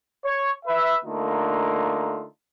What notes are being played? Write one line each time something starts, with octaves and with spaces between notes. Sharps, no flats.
C#5
B4 E5
D3 A3 A#3 D#4 F4